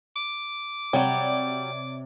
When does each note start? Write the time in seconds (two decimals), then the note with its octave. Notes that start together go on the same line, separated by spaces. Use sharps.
0.16 D6
0.93 C3 F#3 G3 C#5 D5